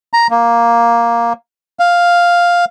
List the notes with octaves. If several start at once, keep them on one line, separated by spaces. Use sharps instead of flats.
A#5
A#3
F5